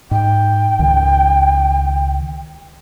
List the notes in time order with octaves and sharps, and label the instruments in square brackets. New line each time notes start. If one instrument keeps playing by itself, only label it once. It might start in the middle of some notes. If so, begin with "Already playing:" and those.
[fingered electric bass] G#2 [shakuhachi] G5
[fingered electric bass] C#2 D#3